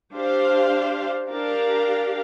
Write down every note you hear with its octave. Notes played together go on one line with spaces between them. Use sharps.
D4 G4 C5 F5
D4 G4 A#4 F5